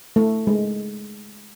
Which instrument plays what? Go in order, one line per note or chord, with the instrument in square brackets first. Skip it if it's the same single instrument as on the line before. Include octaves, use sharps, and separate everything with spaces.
[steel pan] A3
G#3